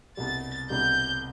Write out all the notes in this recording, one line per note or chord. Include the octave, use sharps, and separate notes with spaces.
C2 B2 G3 A6
C2 B2 G3 G6